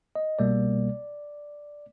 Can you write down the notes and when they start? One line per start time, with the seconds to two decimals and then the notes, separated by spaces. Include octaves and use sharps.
0.15 D#5
0.39 C2 B2 G3 A#3 D5